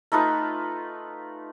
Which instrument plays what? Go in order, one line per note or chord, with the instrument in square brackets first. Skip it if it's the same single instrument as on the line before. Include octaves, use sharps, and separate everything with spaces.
[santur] A3 D#4 F4 B4